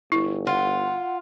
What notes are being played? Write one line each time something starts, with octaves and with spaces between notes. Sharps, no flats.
G1 E4
F4 F#5